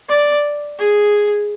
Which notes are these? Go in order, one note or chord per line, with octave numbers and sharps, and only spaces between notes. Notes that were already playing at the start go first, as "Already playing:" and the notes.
D5
G#4